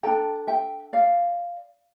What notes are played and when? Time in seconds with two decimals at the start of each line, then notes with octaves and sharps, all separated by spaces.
0.03 D4 A4 G5 A#5
0.47 E5 G5
0.93 D5 F5